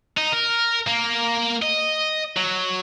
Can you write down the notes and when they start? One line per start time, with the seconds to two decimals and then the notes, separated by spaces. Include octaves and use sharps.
0.18 D#4
0.33 A#4
0.88 A#3
1.62 D#5
2.37 F#3